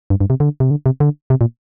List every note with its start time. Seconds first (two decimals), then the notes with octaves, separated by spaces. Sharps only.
0.10 G2
0.21 G2
0.30 C3
0.40 D3
0.60 C3
0.71 D3
0.86 C3
1.00 D3
1.30 C3
1.41 A#2